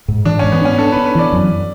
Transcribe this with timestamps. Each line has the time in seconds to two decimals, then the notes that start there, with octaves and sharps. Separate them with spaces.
0.08 G#2
0.25 E3 D4
0.39 G#2 C#4
0.52 B3
0.61 C#4 D4
0.78 D4 A4
0.92 D4 B4
1.06 B4
1.15 E3 D5
1.33 F#2